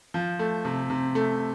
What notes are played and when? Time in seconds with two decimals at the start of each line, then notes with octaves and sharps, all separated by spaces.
0.14 F3
0.39 A3
0.65 C3
0.90 C3
1.15 A3